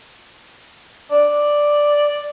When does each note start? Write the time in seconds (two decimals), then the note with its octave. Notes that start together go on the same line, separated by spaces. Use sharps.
1.11 D5